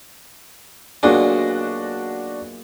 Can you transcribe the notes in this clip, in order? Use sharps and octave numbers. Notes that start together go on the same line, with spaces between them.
B1 A#2 G#3 D4 F#4